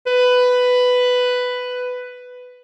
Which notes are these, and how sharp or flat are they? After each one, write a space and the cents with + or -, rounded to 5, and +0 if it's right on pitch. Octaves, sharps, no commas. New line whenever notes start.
B4 +10